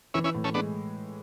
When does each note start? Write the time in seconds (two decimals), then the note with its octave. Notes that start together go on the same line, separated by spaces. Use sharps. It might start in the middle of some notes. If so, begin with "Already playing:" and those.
0.14 E3 C#4 E4
0.24 C#4 E4
0.35 A2
0.44 A3 C#4
0.54 G#3 B3 D4